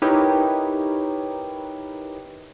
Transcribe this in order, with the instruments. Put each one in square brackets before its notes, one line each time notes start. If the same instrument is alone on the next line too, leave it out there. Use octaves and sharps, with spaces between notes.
[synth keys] D#4 E4 G4 A#4 B4 C#5